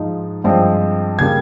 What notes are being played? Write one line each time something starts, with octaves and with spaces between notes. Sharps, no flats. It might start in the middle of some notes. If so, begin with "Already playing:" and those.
Already playing: G#2 F3 G#3 D#4
G2 F3 G#3 C4
C#3 G3 A#3 G#6